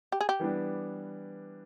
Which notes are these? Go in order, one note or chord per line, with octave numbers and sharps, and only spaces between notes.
G4
G#4
G4
E3 G3 B3 D4